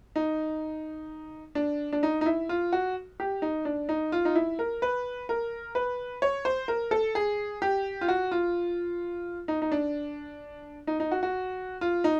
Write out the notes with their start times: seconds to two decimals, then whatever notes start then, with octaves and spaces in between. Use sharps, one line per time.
0.16 D#4
1.55 D4
1.93 D4
2.03 D#4
2.21 D#4
2.26 E4
2.49 F4
2.72 F#4
3.20 G4
3.42 D#4
3.65 D4
3.89 D#4
4.12 F4
4.25 D#4
4.36 E4
4.59 A#4
4.82 B4
5.29 A#4
5.75 B4
6.22 C#5
6.45 C5
6.68 A#4
6.91 A4
7.15 G#4
7.62 G4
8.01 F4
8.08 F#4
8.31 F4
9.48 D#4
9.62 D#4
9.72 D4
10.87 D#4
11.00 D#4
11.12 F#4
11.23 F#4
11.81 F4
12.04 D#4